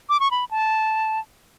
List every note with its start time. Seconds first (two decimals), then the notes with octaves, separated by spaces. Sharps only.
0.09 D6
0.20 C#6
0.31 B5
0.51 A5